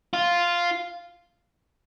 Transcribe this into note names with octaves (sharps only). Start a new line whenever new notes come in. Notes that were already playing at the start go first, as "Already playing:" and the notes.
F4